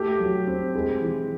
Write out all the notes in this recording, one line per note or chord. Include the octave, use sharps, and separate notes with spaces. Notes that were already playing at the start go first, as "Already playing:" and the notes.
Already playing: A3 G4
F#3
C4
G#3
E3